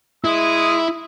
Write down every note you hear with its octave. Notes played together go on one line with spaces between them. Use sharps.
G#3 E4 D#6